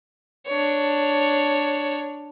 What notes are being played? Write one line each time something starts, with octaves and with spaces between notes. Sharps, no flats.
D4 C#5